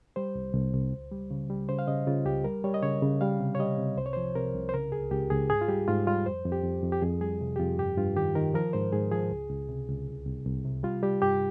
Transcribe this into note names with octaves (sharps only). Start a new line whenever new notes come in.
G3 C5
C2
C2
C2
C#2
G3
C#3
G3
C#3 C5
F5
C#3 D#5
C#3 F4
C#2 G4
G3 A#4
G3 C#5
D#5
C#3 C#5
C#3
G3 F5
C3
C#5
G3 D#5
C3
C2 C5
C#5
F3 C5
C3 A#4
C2
C5
C#3 A#4
C#2 G#4
C#2 G4
C#2 G#4
G#2 G#4
F4
G3 G4
G#2 F4
G3 F4
F2 C5
F2
G4
F2
F2
G4
F2 G#4
G3 G#4
C3
G4
F2 F4
G2 G4
G2 F4
D#3 G4
D#3 A#4
F3 A#4
G#2 C5
G#2 G#4
F3 G#4
C#2
C#2
C3
C#2
C2
C2
C2
C3
G3 F4
G3 G4
G2 G4